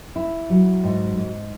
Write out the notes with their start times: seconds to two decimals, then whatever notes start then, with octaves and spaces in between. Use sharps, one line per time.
0.16 E4
0.50 F#3
0.84 G#2
1.17 G#2